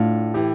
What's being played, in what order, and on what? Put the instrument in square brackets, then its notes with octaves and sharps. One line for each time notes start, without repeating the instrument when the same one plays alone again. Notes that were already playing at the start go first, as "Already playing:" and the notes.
Already playing: [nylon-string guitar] A2 [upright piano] D4 F4
[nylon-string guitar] E3 [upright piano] E4 G4